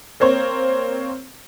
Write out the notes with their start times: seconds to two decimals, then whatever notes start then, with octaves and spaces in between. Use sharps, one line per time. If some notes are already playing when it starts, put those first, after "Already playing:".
0.20 A#3 C4 C5 C#5